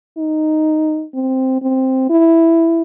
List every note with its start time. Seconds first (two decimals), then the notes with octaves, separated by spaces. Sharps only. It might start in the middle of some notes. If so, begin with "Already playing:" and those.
0.18 D#4
1.14 C4
1.62 C4
2.10 E4